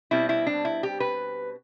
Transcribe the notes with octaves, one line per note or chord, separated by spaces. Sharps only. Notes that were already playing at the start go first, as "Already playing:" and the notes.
B2 G3 C4 E4
E4
D4
E4
G4
B4